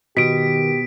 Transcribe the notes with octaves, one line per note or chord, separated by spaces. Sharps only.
B2 D#3 G4 B6 D7